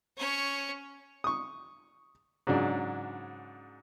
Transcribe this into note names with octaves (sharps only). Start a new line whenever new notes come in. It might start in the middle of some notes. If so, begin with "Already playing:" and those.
C#4 C#5
C#6 D#6
G#2 C#3 F#3 D4